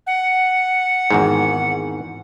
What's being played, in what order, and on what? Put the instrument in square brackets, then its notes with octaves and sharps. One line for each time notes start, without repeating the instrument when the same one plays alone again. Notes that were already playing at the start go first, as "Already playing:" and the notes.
[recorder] F#5
[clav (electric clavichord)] G#1 E2 G#2